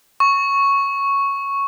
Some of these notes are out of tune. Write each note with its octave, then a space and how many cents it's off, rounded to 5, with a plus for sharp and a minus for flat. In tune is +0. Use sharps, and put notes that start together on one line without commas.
C#6 +0